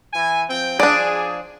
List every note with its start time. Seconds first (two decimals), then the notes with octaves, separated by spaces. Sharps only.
0.13 E3 G#5
0.50 F3 C4 G5
0.80 F3 D4 G#4 D5